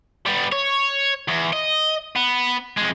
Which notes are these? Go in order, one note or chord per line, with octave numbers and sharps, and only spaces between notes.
G3 B3
C#5
E2
D#5
B3
F2 G#3